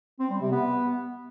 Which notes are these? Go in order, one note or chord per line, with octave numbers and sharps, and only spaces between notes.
C4
G3
C3
B3